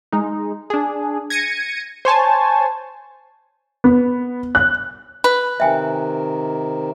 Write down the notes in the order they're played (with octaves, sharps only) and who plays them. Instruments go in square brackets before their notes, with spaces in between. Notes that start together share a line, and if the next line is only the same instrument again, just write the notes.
[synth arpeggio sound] G#3 D#4
D4 G#4
G#6 A#6 C#7 D#7
C5 C#5 G#5 A5
[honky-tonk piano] B3
F#6
[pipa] B4
[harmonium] C3 D#3 [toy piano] E5 G5 G#5